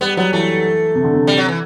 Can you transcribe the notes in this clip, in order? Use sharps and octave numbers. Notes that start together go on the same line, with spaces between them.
G3 B3
F#3 B3
E3 A3
C3
D3
C3
G3
F#3
E3